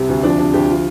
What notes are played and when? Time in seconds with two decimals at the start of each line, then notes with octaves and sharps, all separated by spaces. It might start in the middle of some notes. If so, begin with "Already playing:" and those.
Already playing: C2 C3
0.08 D2
0.23 F3 D4
0.39 C3 D4
0.54 D2 G4
0.69 F3 F4